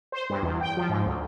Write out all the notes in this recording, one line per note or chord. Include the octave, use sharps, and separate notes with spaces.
C5
G2
E2
G5
F3
G#2
D2